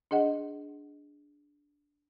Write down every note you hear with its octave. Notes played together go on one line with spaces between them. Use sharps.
D4 G#4 D#5 F#5